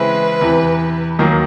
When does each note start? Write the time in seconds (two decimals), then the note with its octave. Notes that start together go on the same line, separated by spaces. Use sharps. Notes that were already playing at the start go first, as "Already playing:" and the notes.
Already playing: C#3 E3 G#3 C4 E4 B4
0.41 E2 C3 E3
1.19 D#2 D#3 F#3 A#3 D#4